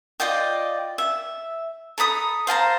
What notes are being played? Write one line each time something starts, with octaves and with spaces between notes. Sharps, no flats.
F4 D5 D#5 G5
E5
A4 A#5 B5 D#6
C5 F5 A5 A#5